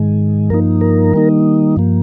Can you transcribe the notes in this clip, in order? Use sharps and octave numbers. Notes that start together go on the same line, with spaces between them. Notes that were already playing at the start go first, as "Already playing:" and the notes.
Already playing: G#2 D#3 G#3
G2 F3 A#3 D#4 A#4
A#4
D#3 G3 A#3 D#4
G2 F3 A#3